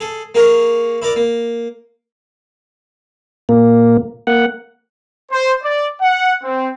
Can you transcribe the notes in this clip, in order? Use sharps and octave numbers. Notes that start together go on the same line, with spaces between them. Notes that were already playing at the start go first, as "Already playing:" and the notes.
G#4 A4
A#3 G#4 A#4 C#5 C#6
E4 A#4 D5 D6
A#3
A#2 A#3
A#3 F#5
C5
D5
F#5
C4